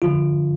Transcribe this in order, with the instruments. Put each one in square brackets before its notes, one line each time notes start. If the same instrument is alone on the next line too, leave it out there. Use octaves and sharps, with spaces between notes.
[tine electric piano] D3 F3 F4